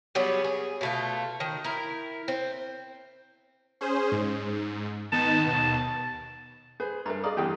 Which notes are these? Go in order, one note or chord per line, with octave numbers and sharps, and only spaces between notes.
F#3 G3 B3 G#4
G#4
B2 A3 F4
D#3
E4 A#4
C4
C#4 G#4 C5
G#2
D#3 B3 D#4 A5
D#2 B2
G#4 B4 C5
G2 A#4 E5 A#5
G#4 D5 D#5 F5 A#5
E2 G2 E3 G4 G#4 G5